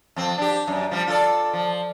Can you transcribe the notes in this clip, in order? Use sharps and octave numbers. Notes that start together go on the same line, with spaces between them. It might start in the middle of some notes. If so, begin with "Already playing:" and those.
F2 C4
D4 G4
F#2
F3 G3
F4 A4 D5
F3